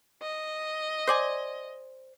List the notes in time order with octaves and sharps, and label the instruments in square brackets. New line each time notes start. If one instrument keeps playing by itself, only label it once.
[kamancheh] D#5
[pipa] C5 D5 G#5